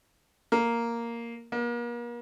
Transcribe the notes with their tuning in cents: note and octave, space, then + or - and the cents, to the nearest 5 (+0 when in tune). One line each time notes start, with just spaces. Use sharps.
A#3 +0
A#3 +40